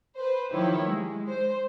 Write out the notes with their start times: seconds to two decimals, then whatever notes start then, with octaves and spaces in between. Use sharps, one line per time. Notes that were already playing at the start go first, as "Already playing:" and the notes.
0.16 B4 C5
0.51 D#3 F3 E4 G4 C#5
0.85 G#3
1.29 C5